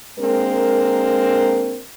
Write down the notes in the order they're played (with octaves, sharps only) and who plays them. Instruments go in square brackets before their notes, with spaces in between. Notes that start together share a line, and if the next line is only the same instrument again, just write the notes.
[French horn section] G#3 A#3 C4 D4 A#4